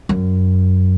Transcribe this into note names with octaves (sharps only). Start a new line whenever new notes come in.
F#2